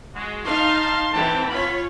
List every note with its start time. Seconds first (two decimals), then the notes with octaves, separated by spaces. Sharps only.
0.15 G#3 F#4
0.46 D#4 F5 A5 C6
1.14 E3 C4 F#5 G5 A5
1.50 F4 C#5 F#5 G#5 B5